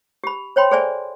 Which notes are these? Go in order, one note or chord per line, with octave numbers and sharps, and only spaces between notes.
G4 B5
C5 C#5 G5 B5 C6
G#4 A4 C5 D5 E5 G#5